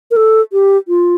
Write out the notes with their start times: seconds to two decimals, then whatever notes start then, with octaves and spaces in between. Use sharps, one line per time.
0.11 A#4
0.16 A4
0.53 G4
0.88 F4